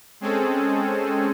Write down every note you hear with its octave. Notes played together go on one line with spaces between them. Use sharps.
G#3 C4 C#4 G#4 A4